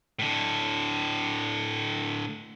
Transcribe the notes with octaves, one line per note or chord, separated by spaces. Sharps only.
A2 D3